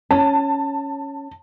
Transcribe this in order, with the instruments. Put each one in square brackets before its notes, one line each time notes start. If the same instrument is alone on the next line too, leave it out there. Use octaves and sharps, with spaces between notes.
[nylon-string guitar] C#4 [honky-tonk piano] A5